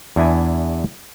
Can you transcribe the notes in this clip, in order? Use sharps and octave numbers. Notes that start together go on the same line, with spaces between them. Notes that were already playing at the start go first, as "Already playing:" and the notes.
E2 D4 E4 G#5